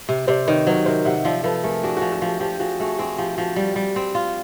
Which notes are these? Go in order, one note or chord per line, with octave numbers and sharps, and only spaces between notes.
C3
C3 C5 D5
D#3 B4 C#5
F#3 A#4 C5
C3 A#4 C5
C3 E5 F#5
F3 D5 E5
F3 A4 B4
A3 G#4 A#4
D4 F#4 G#4
F3 F#4 G#4
F#4
F3 G4
F3 G4
F3 F#4 G#4
A3 F#4 G#4
C4 F#4 G#4
F3 G4
F3 F#4
G3
G3
C4
F4